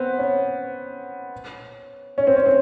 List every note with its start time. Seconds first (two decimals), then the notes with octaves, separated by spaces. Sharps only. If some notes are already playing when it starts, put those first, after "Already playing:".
Already playing: B3 C4
0.19 C#4
2.18 C#4
2.27 C4
2.36 C#4
2.46 C4